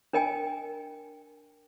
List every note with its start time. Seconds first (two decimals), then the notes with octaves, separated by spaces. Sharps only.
0.13 D4 A#4 D#5 G5 G#5